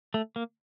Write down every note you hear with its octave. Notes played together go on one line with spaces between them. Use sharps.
A3
A#3